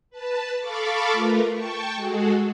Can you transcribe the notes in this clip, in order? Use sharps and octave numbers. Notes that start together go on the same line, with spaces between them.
B4 A5
A4 F5 B5 C#6 D6 A6
A3 F4 A#4 B4
G5 A5 C#6
G#3 F#4 G#4 A4